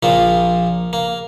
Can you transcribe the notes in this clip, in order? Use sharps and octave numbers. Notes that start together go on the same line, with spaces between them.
A#1 A#2 F3 A#3
A#3